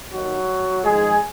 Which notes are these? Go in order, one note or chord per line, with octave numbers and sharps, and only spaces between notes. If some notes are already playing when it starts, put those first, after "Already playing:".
D#2 D#3 F#3 F#4
F2 D#3 G#3 G#4